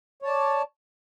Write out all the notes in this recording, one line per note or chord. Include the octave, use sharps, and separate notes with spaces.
C#5 D5 A5